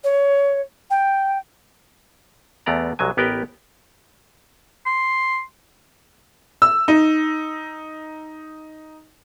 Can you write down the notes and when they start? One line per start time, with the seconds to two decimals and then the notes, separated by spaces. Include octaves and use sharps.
0.03 C#5
0.90 G5
2.66 E2 A3 B3 D5 A#5
2.99 C2 F#3 G#3 G#5
3.17 A1 B3 G4 A#4 B4 G5
4.86 C6
6.62 E6
6.88 D#4